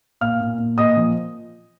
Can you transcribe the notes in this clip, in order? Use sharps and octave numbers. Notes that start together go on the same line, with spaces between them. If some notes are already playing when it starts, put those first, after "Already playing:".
A#2 F5 F6
A#2
A#2
A#2 D#5 D#6
F3